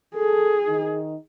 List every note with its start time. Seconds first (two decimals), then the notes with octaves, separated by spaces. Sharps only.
0.15 G#4 A4
0.67 D#3 D#4